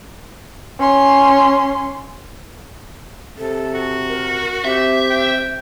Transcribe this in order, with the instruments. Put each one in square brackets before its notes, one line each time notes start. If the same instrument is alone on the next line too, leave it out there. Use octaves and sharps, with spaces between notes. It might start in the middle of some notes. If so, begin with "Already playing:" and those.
[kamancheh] C#4 C6
[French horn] C3 [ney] A4
[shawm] F#4
[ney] A#4
[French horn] C4 [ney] G4 [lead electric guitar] E5
[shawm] G5